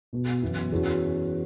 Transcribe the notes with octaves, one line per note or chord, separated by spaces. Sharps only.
B2 B3 F#4
F#2 E3 B3 E4
E2 E3 C#4 F#4